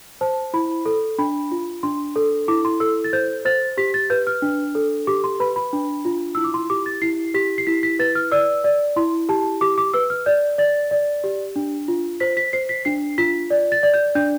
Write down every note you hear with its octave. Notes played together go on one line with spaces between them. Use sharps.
C5 A5
E4 B5
A4
D4 B5
F4
D4 C6
A4
E4 D6
C6
A4 E6
A6
C5 G6
C5 A6
G4 B6
A6
B4 G6
F6
D4
A4
G4 D6
C6
B4 B5
B5
D4
F4
E4 E6
D6
C6
G4 D6
A6
E4 C7
G4 B6
C7
E4 B6
B6
B4 A6
F6
D5 E6
D5
E4 C6
G4 A5
G4 D6
D6
B4 E6
F6
D5 G6
D5 A6
D5
G4
D4
F4
C5 B6
B6
C5 C7
B6
D4 C7
F4 B6
D5
A6
D5
G6
D4 G6